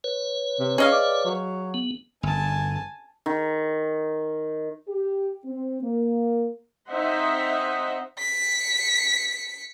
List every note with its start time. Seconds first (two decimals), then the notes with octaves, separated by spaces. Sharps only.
0.04 B4 C#5
0.59 C3
0.78 C#4 G#4 D#5 F5
0.92 D5
1.25 F#3
1.74 B3
2.23 G1 G#5 A5
3.26 D#3
4.89 G4
5.45 C4
5.82 A#3
6.90 C4 D#4 C5 D#5 E5 F#5
8.18 B6 C#7